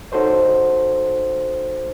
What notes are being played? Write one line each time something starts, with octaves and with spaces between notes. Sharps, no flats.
D#4 F#4 A4 C5 C#5